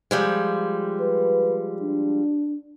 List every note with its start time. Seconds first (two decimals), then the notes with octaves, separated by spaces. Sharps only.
0.11 F3 G3 G#3
1.01 B4
1.82 D4